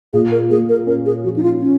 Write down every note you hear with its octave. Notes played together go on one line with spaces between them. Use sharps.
A#2 G#4
A#4
A#3 G#4
A#4
C#4 A#4
G#4
F3 F#4
D#4
F4
C#4